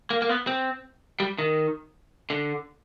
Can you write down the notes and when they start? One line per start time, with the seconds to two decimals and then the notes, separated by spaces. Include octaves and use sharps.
0.10 A#3
0.22 A#3
0.29 B3
0.47 C4
1.20 G3
1.39 D#3
2.30 D3